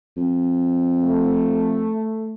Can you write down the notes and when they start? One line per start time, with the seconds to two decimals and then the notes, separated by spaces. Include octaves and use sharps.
0.16 F2
1.02 A3